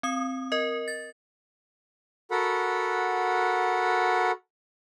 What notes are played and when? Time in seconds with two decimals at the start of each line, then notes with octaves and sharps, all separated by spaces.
0.03 C4 D#6
0.52 A#4 D#5
0.88 A6
2.31 F#4 A4 A#4 F#5 B5